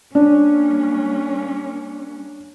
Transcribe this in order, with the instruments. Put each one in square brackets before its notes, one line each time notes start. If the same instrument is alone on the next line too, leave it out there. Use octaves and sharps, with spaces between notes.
[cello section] G3 A#3 C#4 [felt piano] D4